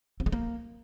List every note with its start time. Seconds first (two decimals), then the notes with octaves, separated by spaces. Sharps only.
0.20 C4
0.26 G#3
0.32 A#3